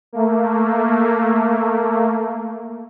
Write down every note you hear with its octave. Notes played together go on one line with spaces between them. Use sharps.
A3 A#3